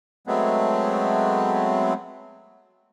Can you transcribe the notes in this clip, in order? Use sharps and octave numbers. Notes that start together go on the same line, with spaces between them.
F#3 G#3 A3 B3 C4